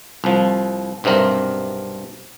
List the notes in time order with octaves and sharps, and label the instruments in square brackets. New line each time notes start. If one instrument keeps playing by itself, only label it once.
[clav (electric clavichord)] C2 F3
B1 G2 C3 C4 A#4